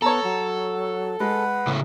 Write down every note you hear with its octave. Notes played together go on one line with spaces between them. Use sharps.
B3 A4 C#5 A5 A#5
F#3
G#3 B4 F#5
A2 C#3 A3